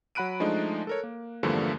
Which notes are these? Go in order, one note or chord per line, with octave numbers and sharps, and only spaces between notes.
F#3 F#5 B5 F#6 D7 D#7
F3 G#3 A3 D4 D#4
A4 A#4 C#5
A#3
E2 G2 D3 F3 A3 A#3